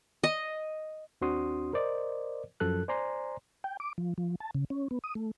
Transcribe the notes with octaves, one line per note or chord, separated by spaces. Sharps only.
D#5
D#2 C4 D4 F#4 C6 D#6
A#4 C5 D5 D#5
F#2 F3 A4 F#6
C5 D5 G#5 A#5 C6
G5
D6
F3
F3
A5
C#3
C#4
B3
D#6
A3